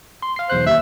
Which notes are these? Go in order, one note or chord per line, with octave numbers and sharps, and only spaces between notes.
C6
F5 C7
B1 E2 C5 F#6
D#2 E5